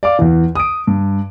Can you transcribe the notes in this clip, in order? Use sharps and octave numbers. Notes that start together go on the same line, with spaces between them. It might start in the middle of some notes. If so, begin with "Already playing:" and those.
D5 F5 D6
E2 E3
D#6 D7
G2